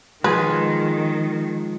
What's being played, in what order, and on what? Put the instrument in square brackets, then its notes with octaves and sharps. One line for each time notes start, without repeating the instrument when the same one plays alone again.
[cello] D#3 [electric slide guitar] F3 G#3 [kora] F4 G#4 [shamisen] B4